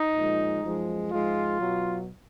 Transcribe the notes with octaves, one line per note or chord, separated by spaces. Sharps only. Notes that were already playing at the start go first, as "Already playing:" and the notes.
Already playing: D#4
A#2 F3 G#3
F#2 F3 G#3
G#2 F3 G#3 F4
B2 F#3